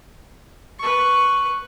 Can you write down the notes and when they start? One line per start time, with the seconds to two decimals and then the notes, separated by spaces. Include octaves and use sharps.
0.79 B4 C#6